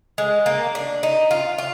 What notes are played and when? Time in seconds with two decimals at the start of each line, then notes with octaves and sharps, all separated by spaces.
0.18 G#3
0.46 A#3
0.75 D4
1.03 D#4
1.31 F4
1.58 F4